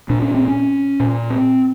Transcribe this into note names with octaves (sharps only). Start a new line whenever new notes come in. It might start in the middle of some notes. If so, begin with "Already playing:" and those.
A#2 D4
C#4
C4
C#4
A#2
C4